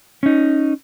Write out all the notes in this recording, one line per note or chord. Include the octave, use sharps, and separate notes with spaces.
C#4 D#4